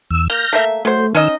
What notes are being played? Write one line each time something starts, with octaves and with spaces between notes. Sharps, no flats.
E2 E6
A#3 F6 G6 A#6
A3 A#3 E5
F#3 A3 C5
D#3 C#4 D#4 D#5 E6